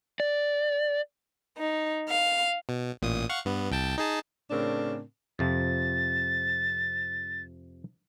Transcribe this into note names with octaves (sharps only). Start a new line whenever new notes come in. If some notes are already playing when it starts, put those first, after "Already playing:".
D5
D#4
F5
B2
A1 A#2 D#6
F5 F#5 C#6
G2 B3
C2 G5 A5
D#4 G#4 A5
A2 C#3 C4 D4 A#4
F2 C3 F3 A6